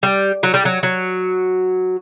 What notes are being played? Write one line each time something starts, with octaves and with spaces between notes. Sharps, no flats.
G3
F#3
G3
F#3
F#3